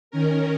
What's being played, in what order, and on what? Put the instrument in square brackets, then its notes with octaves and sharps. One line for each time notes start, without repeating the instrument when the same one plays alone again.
[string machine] D#3 C#4 A#4